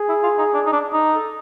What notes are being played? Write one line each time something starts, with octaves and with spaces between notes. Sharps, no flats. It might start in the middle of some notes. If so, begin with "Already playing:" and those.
Already playing: G#4
E4
F4
D#4
D4
D#4
D4
D#4
A4